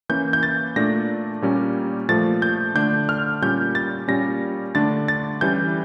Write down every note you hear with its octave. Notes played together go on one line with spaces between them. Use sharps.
E3 A#3 C#4 G6
G6
A6
A#2 A3 D4 A#6
A#2 G3 A#3 C#4
A#2 F3 A3 A6
G6
D3 A3 D4 G6
F6
A#2 G3 C#4 G6
A6
A#2 G3 C#4 A#6
D3 A3 D4 A6
A6
E3 G3 C#4 G6